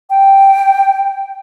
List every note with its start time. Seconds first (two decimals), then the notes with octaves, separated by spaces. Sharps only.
0.10 G5